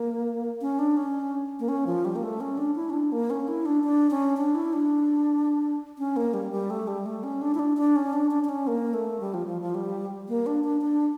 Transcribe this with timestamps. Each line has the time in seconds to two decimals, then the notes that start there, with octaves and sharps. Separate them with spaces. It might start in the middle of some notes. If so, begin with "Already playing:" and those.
Already playing: A#3
0.61 C#4
0.79 D4
0.97 C#4
1.60 A#3
1.69 C#4
1.87 F3
2.05 G3
2.16 A#3
2.23 A3
2.40 C#4
2.58 D4
2.75 E4
2.90 C#4
2.93 D4
3.12 A#3
3.30 C#4
3.48 E4
3.66 D4
3.84 D4
4.11 C#4
4.37 D4
4.55 E4
4.73 D4
5.98 C#4
6.16 A#3
6.34 G3
6.51 G3
6.70 A3
6.88 G3
7.06 A3
7.24 C#4
7.42 D4
7.55 E4
7.59 D4
7.77 D4
7.96 C#4
8.13 D4
8.31 D4
8.44 D4
8.49 C#4
8.67 A#3
8.94 A3
9.20 G3
9.34 F3
9.47 F3
9.62 F3
9.75 G3
10.29 A#3
10.46 D4
10.64 D4
10.81 D4